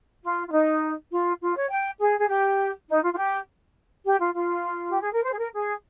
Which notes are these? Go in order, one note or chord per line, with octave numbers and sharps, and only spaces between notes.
F4
F4
D#4
F4
F4
C#5
G5
G#4
G#4
G4
D#4
F4
F4
G4
G4
F4
F4
G4
G#4
A#4
C5
G#4
A#4
G#4